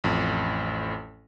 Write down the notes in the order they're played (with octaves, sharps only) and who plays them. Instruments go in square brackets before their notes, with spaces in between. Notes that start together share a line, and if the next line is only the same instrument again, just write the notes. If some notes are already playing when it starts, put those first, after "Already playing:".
[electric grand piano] A1 F2